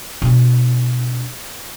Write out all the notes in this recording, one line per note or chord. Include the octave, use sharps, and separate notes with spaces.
B2 D4